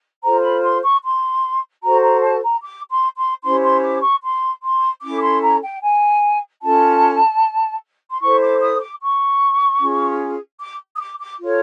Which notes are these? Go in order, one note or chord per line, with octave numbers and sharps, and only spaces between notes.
F4 A4 C5 A#5
B5
C6
C#6
C6
F#4 A4 C5 A#5
A#5
A5
A#5
D6
C6
C6
C#4 E4 G4 C5 C6
C6
D6
C#6
C6
C6
C#4 E4 A4 D6
C6
A#5
G5
G#5
C#4 F4 A4 A5
C6
E4 A4 C5 C#6
D6
D#6
D6
C#6
C#4 F4 G#4
D6
D#6
D6
D6
F4 A4 C#5